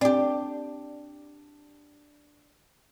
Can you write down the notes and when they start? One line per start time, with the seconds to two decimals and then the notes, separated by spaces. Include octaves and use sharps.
0.01 C4 D4 G4